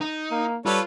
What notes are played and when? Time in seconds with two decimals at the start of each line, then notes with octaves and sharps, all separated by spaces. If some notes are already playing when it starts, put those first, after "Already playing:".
0.01 D#4
0.31 A#3
0.66 G3 F4 A4 B4 C#5